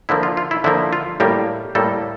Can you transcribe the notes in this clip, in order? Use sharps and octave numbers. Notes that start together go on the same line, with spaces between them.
D3 F3 A#3 E4
F4
F4
E4
D3 F3 A#3 E4
F4
A2 G3 A#3 G4
A2 G3 A#3 A4